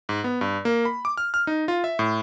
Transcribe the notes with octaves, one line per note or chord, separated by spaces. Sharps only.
G#2
B3
G2
A#3
B5
D6
F6
F6
D#4
F4
E5
A2